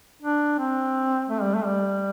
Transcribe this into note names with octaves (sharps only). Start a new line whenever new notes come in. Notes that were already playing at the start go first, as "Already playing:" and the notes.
D4
C4
A3
G3
A3
G3